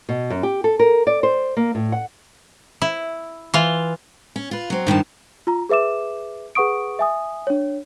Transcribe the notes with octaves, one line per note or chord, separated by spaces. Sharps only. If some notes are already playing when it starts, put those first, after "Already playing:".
B2
F#2
G4
A4
A#4
D5
C5
A#3
A2
F#5
E4
E3 F4
C#4
F4 B4
F#3 C4
G2 D#3 F3 A5
F4 A#5
G#4 B4 E5 D6 E7
G#4 B4 F#5 C#6 D#6 D7
E5 G#5 D#6
D4 C#5